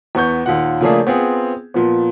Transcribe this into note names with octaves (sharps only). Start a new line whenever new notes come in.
E2 B3 C#6 G6
D#2 A#2 F#5
C#3 F3 A3 A#3 D4 G#4
B3 C4 F4 G#4
A#2 F3 B3